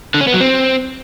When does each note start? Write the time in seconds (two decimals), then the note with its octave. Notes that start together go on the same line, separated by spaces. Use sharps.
0.14 D3
0.21 C#4
0.27 B3
0.34 F#3
0.40 C4